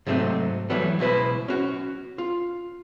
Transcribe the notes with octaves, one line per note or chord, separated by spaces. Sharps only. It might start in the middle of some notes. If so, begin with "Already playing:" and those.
G#2 C3 F#3 A3 C4 D#4
E3 F#3 G3 A3 B3
C#2 B2 E4 B4 C5
C#4 F#4
F4